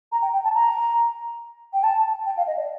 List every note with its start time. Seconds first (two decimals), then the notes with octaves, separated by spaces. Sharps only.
0.11 A#5
0.22 G5
0.33 G5
0.44 A5
0.54 A#5
1.73 G5
1.83 A5
2.26 G5
2.37 F5
2.47 D#5
2.57 D5